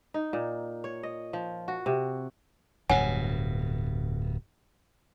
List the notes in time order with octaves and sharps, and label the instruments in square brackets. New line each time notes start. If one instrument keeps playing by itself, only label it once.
[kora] D#4
A#2
C#5
D#5
F3
F#4
C3
[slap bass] D1 G2 B2 [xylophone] C#5 F#5 G#5